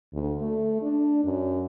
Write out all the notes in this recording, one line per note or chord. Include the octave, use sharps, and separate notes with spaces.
D2
A3
D4
F#2